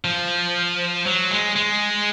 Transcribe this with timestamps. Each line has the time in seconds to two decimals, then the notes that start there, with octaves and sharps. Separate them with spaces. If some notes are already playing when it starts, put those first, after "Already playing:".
0.05 F3
1.06 F#3
1.31 G#3
1.56 G#3